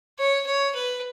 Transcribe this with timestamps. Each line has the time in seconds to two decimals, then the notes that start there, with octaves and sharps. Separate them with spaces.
0.19 C#5
0.46 C#5
0.75 B4